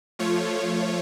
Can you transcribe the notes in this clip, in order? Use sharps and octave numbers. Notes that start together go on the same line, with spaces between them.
F3 A3 F4 C#5